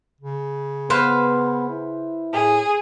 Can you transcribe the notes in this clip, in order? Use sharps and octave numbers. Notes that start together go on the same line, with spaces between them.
C#3
B3 B4 C5 F5
E4
A2 G#4